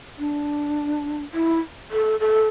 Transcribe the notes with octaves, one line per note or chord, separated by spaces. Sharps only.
D4
E4
A4
A4